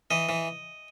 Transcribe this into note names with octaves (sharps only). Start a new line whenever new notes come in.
E3 D#5
E3